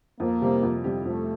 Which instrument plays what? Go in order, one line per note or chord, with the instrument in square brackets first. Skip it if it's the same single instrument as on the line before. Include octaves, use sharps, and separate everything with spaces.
[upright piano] F2 [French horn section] A#3
[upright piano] C3 G3 C4 G4
F2
C3 G3 C4 G4
[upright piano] F2 [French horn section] A3